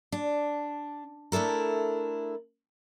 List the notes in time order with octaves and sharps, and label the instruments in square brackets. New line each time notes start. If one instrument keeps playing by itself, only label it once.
[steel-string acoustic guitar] D4
A3 D4 E4 A4 A#4